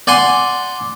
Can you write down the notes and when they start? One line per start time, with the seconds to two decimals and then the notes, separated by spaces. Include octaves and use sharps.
0.07 D5 F#5 G#5 C6